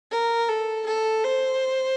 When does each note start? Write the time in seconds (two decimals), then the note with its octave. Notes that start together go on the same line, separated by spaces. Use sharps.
0.12 A#4
0.49 A4
0.86 A4
1.24 C5